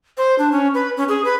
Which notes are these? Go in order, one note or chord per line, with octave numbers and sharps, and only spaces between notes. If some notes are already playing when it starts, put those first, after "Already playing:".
C5
D4
C#4
B4
C#4
G#4
B4